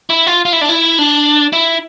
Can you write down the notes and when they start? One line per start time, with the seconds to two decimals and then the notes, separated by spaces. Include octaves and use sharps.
0.10 E4
0.27 F4
0.45 F4
0.53 E4
0.61 D4
0.69 E4
0.99 D4
1.53 E4